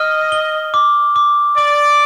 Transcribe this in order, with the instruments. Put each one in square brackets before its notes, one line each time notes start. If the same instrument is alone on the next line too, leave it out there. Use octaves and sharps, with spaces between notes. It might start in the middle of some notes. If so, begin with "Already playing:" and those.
Already playing: [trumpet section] D#5 [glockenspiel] F6
[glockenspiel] G7
D6
D6
[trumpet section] D5 [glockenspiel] D6